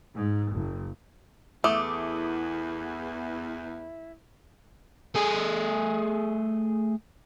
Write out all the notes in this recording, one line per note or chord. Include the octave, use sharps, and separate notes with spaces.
G#2
F#1
E2 A3 E4 D6 D#6
A3 G#4